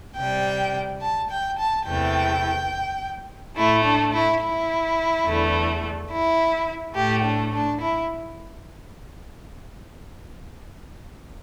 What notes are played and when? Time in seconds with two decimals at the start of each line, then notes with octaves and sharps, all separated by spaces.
0.17 C3 G3 G5
1.02 A5
1.31 G5
1.59 A5
1.87 E2 C3 E3 A3 G5
3.57 A2 A3 E4
3.84 D4
4.14 E4
4.41 E4
5.26 E2 D3 A3
6.11 E4
6.95 A2 A3 G4
7.23 D4
7.53 D4
7.81 E4